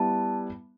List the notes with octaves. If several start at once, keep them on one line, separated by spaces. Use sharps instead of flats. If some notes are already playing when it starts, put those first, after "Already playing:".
Already playing: G3 B3 E4 A5